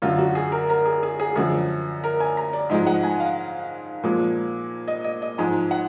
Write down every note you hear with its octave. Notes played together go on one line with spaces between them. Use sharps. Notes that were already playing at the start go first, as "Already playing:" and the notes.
F#2 D3 F#3 F4
F#4
G#4
A#4
A#4
G#4
G#4
G#4
F#2 D3 F3 G#4
A#4
G#5
A#5
D5
G#2 F3 G#3 D#5
F#5
G#5
F5
A#2 F3 G#3
D#5
D#5
D#5
G#2 F3 G#3 G#5
F#5